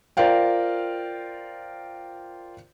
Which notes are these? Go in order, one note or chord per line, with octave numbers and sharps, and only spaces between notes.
F4 A#4 C5 D5 F5 G5